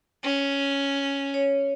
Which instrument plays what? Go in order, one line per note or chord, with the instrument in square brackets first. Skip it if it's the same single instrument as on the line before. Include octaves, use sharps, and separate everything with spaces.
[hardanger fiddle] C#4
[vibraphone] C#5